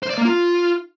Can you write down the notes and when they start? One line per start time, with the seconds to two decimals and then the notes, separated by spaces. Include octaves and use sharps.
0.03 C5
0.10 D5
0.18 A#3
0.25 F4